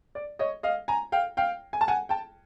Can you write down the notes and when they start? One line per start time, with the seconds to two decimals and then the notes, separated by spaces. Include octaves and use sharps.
0.15 D5
0.39 C#5 D#5
0.63 D#5 F5
0.88 G#5 A#5
1.12 F5 G5
1.37 F5 G5
1.73 G#5
1.81 A5
1.88 F#5 G#5
2.09 G5 A5